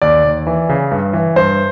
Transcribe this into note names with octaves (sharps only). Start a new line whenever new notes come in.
D#2 D5
D#2
E3
C#3
G2
E3
G2 C5